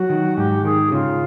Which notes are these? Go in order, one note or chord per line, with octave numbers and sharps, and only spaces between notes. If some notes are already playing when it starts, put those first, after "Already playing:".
Already playing: F#3 F#4
D#3
G#2 G4
D#3 G#4
C#3 F4